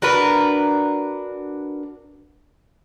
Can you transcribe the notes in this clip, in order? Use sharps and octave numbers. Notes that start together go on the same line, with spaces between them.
D4 F#4 A#4 B4